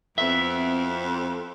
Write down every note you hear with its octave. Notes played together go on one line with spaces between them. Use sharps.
F2 B3 C4 E4 E5